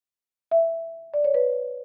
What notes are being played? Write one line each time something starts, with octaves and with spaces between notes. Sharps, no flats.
E5
D5
C#5
B4